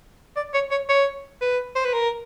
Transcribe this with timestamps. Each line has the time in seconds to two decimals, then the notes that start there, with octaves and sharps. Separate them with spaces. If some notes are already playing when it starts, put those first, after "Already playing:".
0.37 D5
0.54 C#5
0.71 C#5
0.89 C#5
1.41 B4
1.75 C5
1.85 B4
1.93 A#4